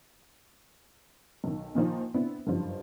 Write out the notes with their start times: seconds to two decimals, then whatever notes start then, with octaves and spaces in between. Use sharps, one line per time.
1.44 B1 D#3
1.75 A#2 D#3 F3 D#4
2.14 B3 C4 D4 E4
2.47 F#1 G2 F3